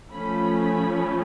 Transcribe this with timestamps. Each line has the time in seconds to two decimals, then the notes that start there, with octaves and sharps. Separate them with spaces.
0.11 F3 A3 C#4 B5
0.57 B5